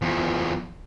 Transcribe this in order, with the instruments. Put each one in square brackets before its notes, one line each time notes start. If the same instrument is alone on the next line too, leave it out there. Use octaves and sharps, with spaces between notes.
[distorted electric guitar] E2 F3